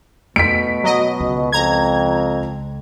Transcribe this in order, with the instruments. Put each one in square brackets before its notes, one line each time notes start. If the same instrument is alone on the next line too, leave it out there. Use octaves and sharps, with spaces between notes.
[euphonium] B2 [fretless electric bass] A3 [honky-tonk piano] B6 D7
[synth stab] F#3 D#5
[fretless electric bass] C#2
[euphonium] F2 [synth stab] A#5 G#6